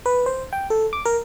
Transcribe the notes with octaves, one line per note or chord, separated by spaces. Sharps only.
B4
C5
G5
A4
D6
A#4